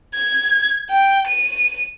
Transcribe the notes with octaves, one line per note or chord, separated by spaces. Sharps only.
G#6
G5
D#7